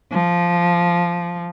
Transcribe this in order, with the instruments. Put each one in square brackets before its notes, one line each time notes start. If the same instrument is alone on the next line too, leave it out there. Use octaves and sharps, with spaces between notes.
[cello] F3